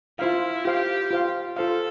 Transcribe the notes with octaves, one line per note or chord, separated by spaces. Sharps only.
E4 F4 C5 F5
F4 G4 C5 F5
F4 C5 F5
F4 A4 C5 F5